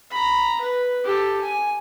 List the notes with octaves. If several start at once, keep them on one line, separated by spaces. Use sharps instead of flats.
A#5 B5
B4
G4 A4
G#5